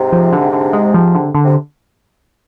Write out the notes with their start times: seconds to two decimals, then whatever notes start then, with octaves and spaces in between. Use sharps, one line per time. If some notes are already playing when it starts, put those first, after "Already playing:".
Already playing: G#2 C3
0.13 F3
0.33 D3
0.53 D3
0.73 G#3
0.94 F3
1.15 D3
1.35 D3
1.45 C3